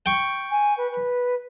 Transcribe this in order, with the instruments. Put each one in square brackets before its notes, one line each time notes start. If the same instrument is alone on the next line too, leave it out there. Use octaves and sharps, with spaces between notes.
[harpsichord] G5 C#6
[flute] G#5
B4
B4